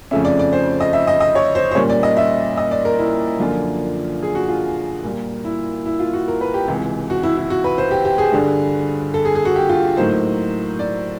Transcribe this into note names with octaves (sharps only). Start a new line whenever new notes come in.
F2 C#3 F3 A3 C#4 E5
D5
D5
C5
D#5
E5
D#5
D#5
C#5
C5
C5
A#2 G3 A#3 C#4 C#5
D5
D#5
E5
D#5
D5
A#4
E4
F#2 D3 F3 A#3 D4 F4
G#4
F#4
F4
A#2 G3 A#3
E4
E4
F4
F#4
A#4
B4
G4
C#2 C3 E3
F#4
E4
E4
F#4
B4
C5
G4
G4
G#4
G2 D3 G3
A4
G#4
G#4
F#4
G4
F4
A2 F#3 A#3 D#4 C5
D5